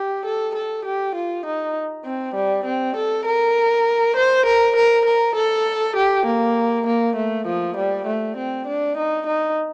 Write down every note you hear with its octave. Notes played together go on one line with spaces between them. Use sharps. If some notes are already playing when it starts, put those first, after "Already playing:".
Already playing: G4
A4
A4
G4
F4
D#4
C4
G3
C4
A4
A#4
C5
A#4
A#4
A#4
A4
G4
A#3
A#3
A3
F3
G3
A3
C4
D4
D#4
D#4